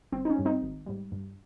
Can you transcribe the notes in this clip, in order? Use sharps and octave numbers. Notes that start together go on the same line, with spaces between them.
G1 C4
D#4
C#4
G2 G3
C4 D#4
G#1
G#2 G3
G2